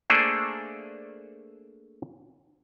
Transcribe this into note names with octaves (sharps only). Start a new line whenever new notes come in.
A3 A#3 D4 G#4 A4 C5